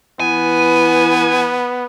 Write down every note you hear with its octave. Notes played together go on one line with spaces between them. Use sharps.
E3 B3 G#5